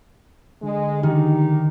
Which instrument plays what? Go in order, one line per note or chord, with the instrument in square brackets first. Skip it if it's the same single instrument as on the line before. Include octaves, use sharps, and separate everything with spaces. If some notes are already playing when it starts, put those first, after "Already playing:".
[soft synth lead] D3 [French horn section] G#3
[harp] D#3 [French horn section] D#4 G4